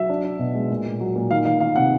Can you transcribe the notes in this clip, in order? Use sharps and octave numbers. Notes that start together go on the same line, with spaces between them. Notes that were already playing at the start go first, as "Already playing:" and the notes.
Already playing: F#3 E5
D4
D4
B2
G#3
A#2
A#2
F#3
A#2
D#3 F5
D#3 F5
D#3 F5
C3 F#5